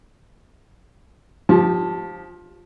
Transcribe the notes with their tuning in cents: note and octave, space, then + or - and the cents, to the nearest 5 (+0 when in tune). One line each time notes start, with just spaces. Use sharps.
F3 +15 G4 +5 A5 -30